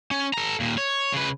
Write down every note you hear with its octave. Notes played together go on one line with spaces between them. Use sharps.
C#4
A4 A#5
D#2 A#2
C#5
C#3 B4